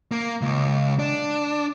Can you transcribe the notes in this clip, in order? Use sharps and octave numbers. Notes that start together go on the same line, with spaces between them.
A#3
C#2
D4